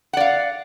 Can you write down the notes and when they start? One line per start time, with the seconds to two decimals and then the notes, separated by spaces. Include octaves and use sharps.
0.13 F#5
0.17 D5
0.20 F5